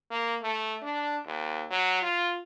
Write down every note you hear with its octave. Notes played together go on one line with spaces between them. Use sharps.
A#3
A3
D4
D#2
F#3
F4